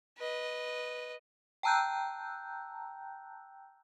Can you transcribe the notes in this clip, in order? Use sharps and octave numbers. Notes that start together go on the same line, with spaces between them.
B4 D#5
G5 A5 A#5 E6 F#6 G6